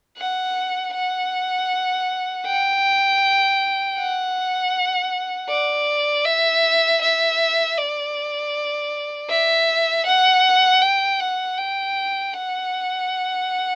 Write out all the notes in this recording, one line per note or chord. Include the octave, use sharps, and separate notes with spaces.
F#5
F#5
G5
F#5
D5
E5
E5
D5
E5
F#5
G5
F#5
G5
F#5